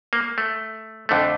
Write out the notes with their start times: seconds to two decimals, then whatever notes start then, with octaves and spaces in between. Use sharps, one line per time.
0.13 A#3
0.38 A3
1.09 F2 D3 A3